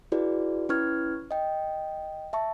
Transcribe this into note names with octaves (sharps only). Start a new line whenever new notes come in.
E4 F#4 G#4 B4 D5
C#4 E4 B4 C#6 F6 G#6
D#5 G5
E5 A5 C#6